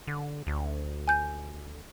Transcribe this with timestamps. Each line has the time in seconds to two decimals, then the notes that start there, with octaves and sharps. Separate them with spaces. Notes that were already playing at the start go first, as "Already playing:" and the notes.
0.08 D3
0.47 D2
1.08 G#5 G6